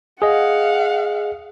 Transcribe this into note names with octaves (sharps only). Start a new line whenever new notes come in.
G#4 D#5 F5 F#5